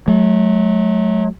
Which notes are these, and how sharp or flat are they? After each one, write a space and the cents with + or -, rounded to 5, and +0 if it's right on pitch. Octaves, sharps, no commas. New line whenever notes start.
F#3 +0 A3 -35